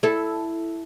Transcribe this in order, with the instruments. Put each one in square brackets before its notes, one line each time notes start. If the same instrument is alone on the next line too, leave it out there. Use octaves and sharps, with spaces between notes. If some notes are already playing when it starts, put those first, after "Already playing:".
[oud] E4 A4